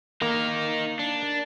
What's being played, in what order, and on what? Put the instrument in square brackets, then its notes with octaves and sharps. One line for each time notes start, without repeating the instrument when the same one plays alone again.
[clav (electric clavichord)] A#3 [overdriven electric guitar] D#4 A#4
[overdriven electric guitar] D4